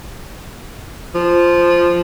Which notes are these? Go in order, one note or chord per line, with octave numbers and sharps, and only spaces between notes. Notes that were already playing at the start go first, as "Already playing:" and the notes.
F3